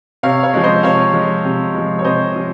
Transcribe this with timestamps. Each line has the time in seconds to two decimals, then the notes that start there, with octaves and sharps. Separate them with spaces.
0.23 C3 C#5 F5
0.43 C#5 F5
0.54 F3 G#3
0.63 C5 D#5
0.83 C3 C#5 F5
1.13 F3 G#3
1.45 C3
1.75 F3 G#3
1.99 C#5
2.04 C3 C5 D#5
2.36 F3